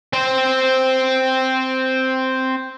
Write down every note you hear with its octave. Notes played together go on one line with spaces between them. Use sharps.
C4 C5